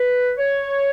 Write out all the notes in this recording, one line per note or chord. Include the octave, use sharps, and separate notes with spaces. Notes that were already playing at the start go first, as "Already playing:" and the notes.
Already playing: B4
C#5